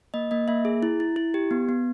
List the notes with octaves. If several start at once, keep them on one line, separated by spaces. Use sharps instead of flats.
A#3 D#5
A#3 D#5
A#3 E5
G#4
E4
E4
E4
G4
B3
B3